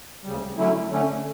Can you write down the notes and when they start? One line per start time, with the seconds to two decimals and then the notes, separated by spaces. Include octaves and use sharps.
0.24 D2 C#3 G3
0.57 D3 F#3 A3 C#4 E4
0.90 D3 A3 C#4